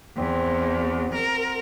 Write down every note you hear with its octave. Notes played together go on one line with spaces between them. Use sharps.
E2 C4
F#4
A#4